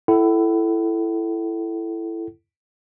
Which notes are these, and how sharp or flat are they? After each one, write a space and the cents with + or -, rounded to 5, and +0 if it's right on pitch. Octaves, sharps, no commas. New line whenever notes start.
E4 +15 A4 +0 F#5 +45